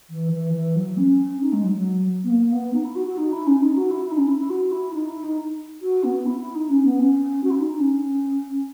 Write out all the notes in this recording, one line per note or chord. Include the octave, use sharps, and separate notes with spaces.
E3
E3
E3
F#3
C#4
D#4
G#3
F#3
F#3
B3
A#3
B3
D#4
E4
F#4
F#4
D#4
E4
C#4
D#4
F#4
E4
E4
D#4
C#4
E4
E4
F#4
E4
D#4
E4
D#4
F#4
B3
E4
E4
D#4
C#4
B3
C#4
F#4
E4
D#4
D#4
C#4